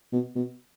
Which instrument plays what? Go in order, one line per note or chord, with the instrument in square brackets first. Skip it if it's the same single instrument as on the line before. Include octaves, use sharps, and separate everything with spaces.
[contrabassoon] B2
B2